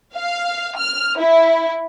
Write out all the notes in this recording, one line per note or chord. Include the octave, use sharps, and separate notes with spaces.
F5
F6
E4